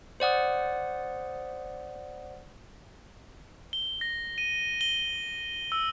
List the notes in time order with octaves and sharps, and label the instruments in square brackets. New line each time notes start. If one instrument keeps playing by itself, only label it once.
[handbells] C5 D5 F#5 D#6
[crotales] G7
A#6
D#7
G7
E6